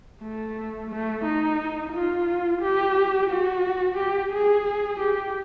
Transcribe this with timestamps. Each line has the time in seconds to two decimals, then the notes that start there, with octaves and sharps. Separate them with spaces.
0.22 A3
0.90 A3
1.25 D#4
1.92 F4
2.62 G4
3.30 F#4
3.97 G4
4.33 G#4
5.00 G4